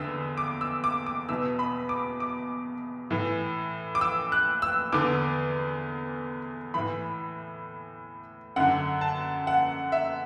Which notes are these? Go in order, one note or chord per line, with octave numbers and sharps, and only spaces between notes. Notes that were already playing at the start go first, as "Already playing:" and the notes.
Already playing: E2 D3 E6
D6
E6
D6
D6
E2 B2 E6
B5
D6
D6
A2 E3
D6
E6
F#6
E6
E2 D3 D6
A2 E3 B5
F#2 D3 F#5
A5
F#5
E5